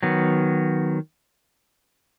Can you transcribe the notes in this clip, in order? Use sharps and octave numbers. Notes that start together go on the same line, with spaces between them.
D#3 F#3 B3